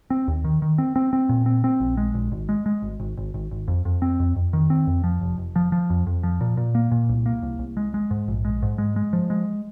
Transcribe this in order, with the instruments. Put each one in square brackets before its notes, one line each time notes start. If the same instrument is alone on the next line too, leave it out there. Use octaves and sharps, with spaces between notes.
[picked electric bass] C4
D#2
D#3
D#3
C4
C4
C4
A#2
C4
C4
A#1
G#3
A#1
G#1
G#3
G#3
G#1
G#1
G#1
G#1
G#1
F2
F2
C4
F2
F2
D#3
C4
F2
F3
F1
F1
F3
F3
F2
F2
F3
A#2
A#2
A#3
A#2
C2
A#3
C2
C2
G#3
G#3
G#2
A#1
G#3
G#2
G#3
G#3
F3
G#3